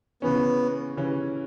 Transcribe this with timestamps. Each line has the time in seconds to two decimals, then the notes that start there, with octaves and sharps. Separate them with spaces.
0.22 C#3 E3 B3 C#4
0.97 C#3 E3 C#4